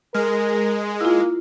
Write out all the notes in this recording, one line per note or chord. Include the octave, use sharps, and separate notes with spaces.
G#3 A#4 F6
A#3 E4 F4